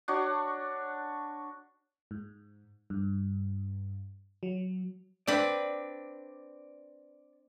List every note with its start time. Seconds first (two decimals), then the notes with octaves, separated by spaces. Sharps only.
0.08 D4 F#4 C#5
2.11 G#2
2.90 G2
4.43 F#3
5.27 C4 D4 B4 D5